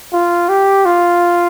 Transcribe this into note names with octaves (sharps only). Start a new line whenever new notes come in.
F4
G4
F4